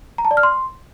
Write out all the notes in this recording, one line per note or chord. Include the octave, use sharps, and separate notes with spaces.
A#5
A5
D5
F6
C6